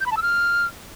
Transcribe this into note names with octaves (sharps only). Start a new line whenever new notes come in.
G6
B5
A5
E6
F6